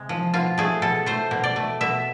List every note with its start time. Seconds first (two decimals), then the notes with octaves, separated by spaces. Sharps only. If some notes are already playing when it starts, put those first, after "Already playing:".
Already playing: C3 G#3
0.09 F3
0.34 B2 F4
0.58 A3 G#4
0.82 B2 A4
1.06 A3 C5
1.31 B2
1.44 D5
1.56 A3
1.81 B2 E5